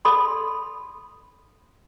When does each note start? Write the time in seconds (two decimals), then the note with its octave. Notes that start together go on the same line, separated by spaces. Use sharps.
0.05 A4 B5 C6